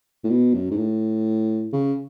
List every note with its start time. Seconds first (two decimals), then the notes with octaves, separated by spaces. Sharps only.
0.24 A2
0.30 B2
0.54 F#2
0.71 G#2
0.77 A2
1.73 C#3